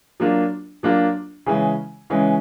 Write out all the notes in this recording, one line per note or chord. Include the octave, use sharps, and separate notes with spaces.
F#3 A#3 D4 F4
F#3 A#3 D4 F4
C#3 E3 G#3 C#4
C#3 E3 G#3 C#4